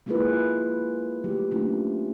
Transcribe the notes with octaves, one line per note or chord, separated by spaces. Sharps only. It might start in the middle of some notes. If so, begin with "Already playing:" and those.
G#3 A#3 E4 F4 G#4 B4
F#3 A3 G4
F#3 A3 A#3 C#4 D4 F4